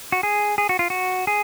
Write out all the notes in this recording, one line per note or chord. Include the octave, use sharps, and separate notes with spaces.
F#4
G#4
G#4
F#4
F4
F#4
G#4